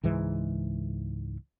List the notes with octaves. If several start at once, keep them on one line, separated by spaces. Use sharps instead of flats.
C#2 G#2 E3 G#3